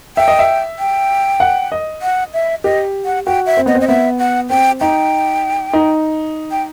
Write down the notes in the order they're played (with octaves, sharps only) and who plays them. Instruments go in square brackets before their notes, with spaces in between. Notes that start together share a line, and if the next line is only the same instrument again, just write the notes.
[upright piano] E5 [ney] G5
[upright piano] D#5
E5
[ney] G5
[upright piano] F#5
D#5
[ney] F#5
E5
[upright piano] G4 [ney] D#5
[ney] F#5
[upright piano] F#4 [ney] G5
[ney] E5
[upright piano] C4
[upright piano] B3 [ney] D#5
[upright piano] C4
[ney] D#5
[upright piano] B3 [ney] E5
[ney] F#5
[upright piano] C4 [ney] G5
[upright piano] D#4 [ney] G5
[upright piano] D#4
[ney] G5